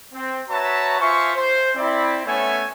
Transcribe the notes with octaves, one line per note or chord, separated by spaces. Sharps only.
C4
F#4 B4 C#5 E5 A5 A#5
F4 C5 E5 G#5 C#6
C5
C4 E4 D5
A3 B3 C#4 C#5 E5 G#5